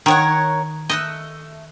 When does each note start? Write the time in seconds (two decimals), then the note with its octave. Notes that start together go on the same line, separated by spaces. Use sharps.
0.06 D#3 A#4 C#5 F#5
0.90 A3 D#5 E6 F#6